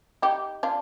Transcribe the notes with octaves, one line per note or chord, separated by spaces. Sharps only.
D#4 G4
D4 F4